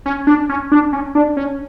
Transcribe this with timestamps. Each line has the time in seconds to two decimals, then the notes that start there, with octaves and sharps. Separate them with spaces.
0.06 C#4
0.27 D4
0.49 C#4
0.72 D4
0.93 C#4
1.15 D4
1.37 C#4